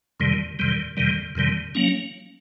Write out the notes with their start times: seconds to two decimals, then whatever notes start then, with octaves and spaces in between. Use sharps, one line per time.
0.20 F2 C3 D#3 G3
0.59 F2 C3 D#3 G3
0.97 F2 C3 D#3 G3
1.35 F2 C3 D#3 G3
1.75 F#3 A#3 C#4